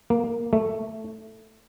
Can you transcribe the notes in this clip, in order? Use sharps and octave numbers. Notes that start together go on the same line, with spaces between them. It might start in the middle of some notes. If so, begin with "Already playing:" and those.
A#3
A3